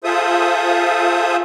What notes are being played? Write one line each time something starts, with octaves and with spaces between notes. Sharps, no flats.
F4 G#4 A4 C5 E5 D#6